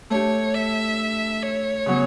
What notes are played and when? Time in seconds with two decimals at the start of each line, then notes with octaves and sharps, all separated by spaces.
0.10 A3 D4 G4 C#5
0.54 E5
1.42 C#5
1.86 C#3 F#3 B3